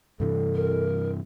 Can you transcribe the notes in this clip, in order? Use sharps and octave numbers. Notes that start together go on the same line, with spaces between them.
G2 C3 E3 A4
A#4